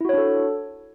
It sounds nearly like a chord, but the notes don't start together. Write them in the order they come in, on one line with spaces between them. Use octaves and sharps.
E4 F#4 C#5 D4 A4